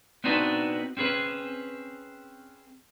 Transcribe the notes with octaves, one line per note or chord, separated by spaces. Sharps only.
B3 C4 D4 D#4 F#4 B4
C4 C#4 G#4 B4